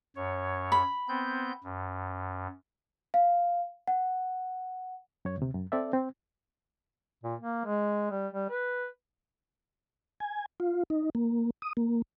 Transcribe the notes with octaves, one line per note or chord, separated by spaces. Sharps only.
F#2 C#5
B5
B3 C4 G6
F#2
F5
F#5
F#2 C#5
D2 C3
F#2
C4 A4 D5 E5
C4
A#2
A#3
G#3
G3
G3
B4
G#5
F4
D#4
A#3
D#6
A#3